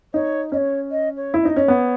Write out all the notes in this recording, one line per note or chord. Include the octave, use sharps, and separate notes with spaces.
D#4 C#5
C#4 D#5
C#5
D#5
C#5
E4
D#4 D#5
C#4
B3 C#5